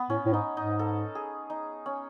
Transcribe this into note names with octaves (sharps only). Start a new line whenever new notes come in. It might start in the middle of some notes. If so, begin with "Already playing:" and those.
Already playing: B3
A2 C#4
A2
G#2 D#4
G#2 D#4
A4
G#4
D#4
C#4